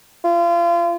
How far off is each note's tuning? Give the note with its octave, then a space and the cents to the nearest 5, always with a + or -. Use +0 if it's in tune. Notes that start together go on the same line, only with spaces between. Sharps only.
F4 -30